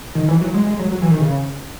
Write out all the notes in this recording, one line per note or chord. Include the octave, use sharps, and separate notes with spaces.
D#3
E3
F#3
G#3
G#3
F#3
F#3
E3
D#3
C#3